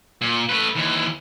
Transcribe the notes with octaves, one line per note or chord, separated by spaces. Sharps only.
A#2
A3 B4
D#2 E3